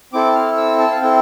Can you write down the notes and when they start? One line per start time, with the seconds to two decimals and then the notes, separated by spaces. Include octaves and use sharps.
0.13 C4 E4 A4 D6
0.35 F6
0.57 E6
0.79 A5
0.91 F5
1.01 C4 E4 A4 G5